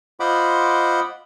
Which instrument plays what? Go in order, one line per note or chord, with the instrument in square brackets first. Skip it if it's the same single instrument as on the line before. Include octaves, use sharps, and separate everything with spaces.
[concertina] F4 C5 D#5 F#5 B5 D6